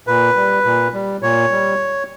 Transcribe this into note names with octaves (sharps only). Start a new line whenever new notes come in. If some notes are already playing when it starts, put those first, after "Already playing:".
A#2 B4
G3
A#2
G3
A#2 C#5
G3